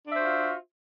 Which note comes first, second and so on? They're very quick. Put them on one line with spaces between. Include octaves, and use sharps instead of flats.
D4 E5 C5 F#4 F4